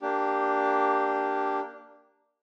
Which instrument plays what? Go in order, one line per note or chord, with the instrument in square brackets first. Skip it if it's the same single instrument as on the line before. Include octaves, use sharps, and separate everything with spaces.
[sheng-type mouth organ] A#3 D4 G4